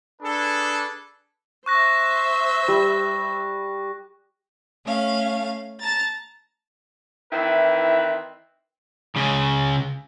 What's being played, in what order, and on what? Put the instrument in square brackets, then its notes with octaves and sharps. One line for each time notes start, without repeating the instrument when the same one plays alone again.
[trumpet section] D4 G#4 A4 B4
[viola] C5 E5 [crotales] C#6 F#6 A#6
[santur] G3
[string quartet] A3 C#4 F5
A5 A#5 A6
[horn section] D#3 E3 C4 E4 B4
[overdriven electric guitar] C#2 C#3